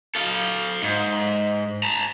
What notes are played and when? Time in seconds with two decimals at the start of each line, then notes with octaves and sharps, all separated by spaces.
0.15 A4 F5
0.83 G#2
1.83 A5 A#5